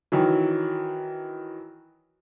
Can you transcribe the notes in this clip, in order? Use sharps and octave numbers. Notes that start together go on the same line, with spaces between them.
D#3 E3 F#3